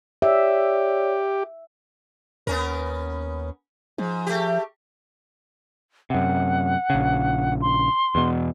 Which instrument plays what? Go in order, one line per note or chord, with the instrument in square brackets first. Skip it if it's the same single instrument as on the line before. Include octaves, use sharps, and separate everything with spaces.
[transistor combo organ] G4 [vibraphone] C#5 D5 [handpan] E5
[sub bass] D#2 [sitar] B3 C#4 A#4
[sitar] G#2 [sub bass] F3
[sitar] A3 G4
[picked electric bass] F#2 C3 [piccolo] F#5
[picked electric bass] A#1 C#3
[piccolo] C6
[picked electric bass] E2 B2